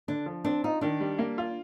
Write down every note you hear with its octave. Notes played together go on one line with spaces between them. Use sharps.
D3 D4
F3
C4 D4
D#4 F4
D#3 D4
G3
A#3
F4